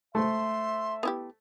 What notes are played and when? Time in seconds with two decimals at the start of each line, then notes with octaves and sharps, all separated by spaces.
0.15 A3 C5 E5 C6
1.03 B3 E4 G4